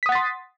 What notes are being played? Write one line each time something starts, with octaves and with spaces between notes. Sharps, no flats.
F#5 C6 D#6 A6 B6